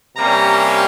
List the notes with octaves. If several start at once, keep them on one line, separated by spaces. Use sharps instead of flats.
C3 G3 A#3 C#4 A#5